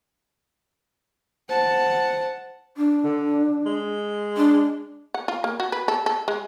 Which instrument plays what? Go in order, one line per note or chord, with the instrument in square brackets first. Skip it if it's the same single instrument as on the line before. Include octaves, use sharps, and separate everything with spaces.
[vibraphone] C5 [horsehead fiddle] F#5 A5
[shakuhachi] D4
[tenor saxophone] D3
G#3
[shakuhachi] D4
[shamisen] F#5
F4
A#3
F#4
B4
A4
A4
G#3